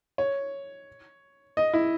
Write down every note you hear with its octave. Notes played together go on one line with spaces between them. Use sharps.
C#5
D#5
E4